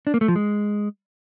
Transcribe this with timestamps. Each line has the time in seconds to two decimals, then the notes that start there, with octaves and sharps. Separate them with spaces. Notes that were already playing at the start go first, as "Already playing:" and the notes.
0.07 D4
0.14 A#3
0.21 A3
0.28 F3
0.36 G#3